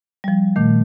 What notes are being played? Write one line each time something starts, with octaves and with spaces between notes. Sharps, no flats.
F3 G3
A#2 D#3 A3